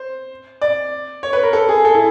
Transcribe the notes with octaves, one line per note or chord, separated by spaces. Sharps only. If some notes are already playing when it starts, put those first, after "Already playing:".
Already playing: C5
D5
C#5
B4
A#4
A4
G#4
A4
E4